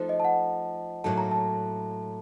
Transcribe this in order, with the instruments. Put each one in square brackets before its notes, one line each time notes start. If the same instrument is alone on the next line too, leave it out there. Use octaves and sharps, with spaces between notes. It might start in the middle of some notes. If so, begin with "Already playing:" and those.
Already playing: [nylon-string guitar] F3 A3 D#4 A4 [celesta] C5
[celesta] D#5
A5
F#5
[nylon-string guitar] A2 F#3 A#3 D#4 A4 [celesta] A5
[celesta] A#5
A5